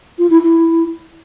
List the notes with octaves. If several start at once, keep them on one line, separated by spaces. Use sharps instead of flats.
F4
E4
E4